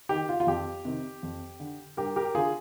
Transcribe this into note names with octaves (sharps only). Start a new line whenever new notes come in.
D#3 G4
F4
F4
F2 G4
C3 D#3
F2
D3
G2 G4 A#4
G4 A#4
D3 F4 G#4